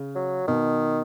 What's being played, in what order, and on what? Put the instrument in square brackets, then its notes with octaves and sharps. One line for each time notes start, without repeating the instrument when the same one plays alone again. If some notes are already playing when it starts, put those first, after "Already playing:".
Already playing: [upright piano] C#3
[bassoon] F#3
[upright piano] B2 [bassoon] D#3